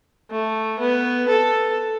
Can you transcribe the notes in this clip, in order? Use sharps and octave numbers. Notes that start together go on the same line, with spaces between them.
A3
B3
A4